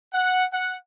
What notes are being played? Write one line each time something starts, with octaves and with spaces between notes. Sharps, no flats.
F#5
F#5